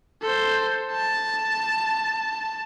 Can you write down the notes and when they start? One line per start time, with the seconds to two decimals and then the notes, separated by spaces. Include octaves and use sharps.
0.22 A4 C5
0.92 A5